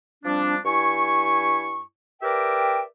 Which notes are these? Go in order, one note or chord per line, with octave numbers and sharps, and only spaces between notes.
F3 G3 C4 D4
G2 E4 G#5 C#6
G4 A#4 B4 D5 E5 G5